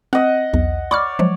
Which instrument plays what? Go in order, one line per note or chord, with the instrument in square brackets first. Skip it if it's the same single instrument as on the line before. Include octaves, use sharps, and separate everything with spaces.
[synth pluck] C4 [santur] D#5 F#5
[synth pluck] B1 E2
[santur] C#5 D5 [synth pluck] B5 D6 F6
[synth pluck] F3 F#3 G#3